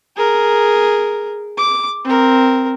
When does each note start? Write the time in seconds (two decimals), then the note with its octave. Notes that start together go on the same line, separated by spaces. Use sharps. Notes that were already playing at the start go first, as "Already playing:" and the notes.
0.16 G#4 A#4
1.57 D6
2.04 C4 A#4